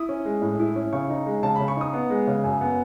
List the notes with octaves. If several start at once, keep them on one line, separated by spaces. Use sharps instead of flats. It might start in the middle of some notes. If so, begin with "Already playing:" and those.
Already playing: E4 D#6
C#4
G#3
A2
E4
C#4
C#3 C#6
D#4
G#3
C#3 A5
C#3 B5
C#6
D#4 D#6
B3
G#3
C#3
F#2
B3